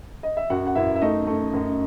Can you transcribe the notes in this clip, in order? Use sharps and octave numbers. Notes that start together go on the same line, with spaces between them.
D#5
E5
F#2 F#4 F#5
F#5
F#2 E4 E5
E5
A3 D#4 D#5
A3
F#2